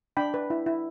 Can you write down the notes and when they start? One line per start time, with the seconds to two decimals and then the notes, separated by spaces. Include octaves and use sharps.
0.17 D4 G5 B5
0.34 B4
0.50 E4
0.66 E4